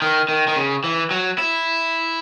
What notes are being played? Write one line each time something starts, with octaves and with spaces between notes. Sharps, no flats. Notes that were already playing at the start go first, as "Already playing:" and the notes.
D#3
D#3
D#3
C#3
E3
F#3
E4